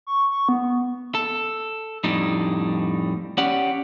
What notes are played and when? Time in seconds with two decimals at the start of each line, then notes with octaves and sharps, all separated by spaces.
0.07 C#6
0.31 C#6
0.49 B3
1.15 A4
2.04 F2 A2 G3 D4 D#4
3.38 C#4 G4 D5 F#5